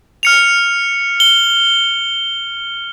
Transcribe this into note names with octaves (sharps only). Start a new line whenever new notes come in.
F6 C#7 F7
G7